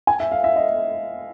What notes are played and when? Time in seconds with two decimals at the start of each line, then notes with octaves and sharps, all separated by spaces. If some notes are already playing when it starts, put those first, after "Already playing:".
0.07 G#5
0.20 E5
0.32 F5
0.44 E5
0.56 D#5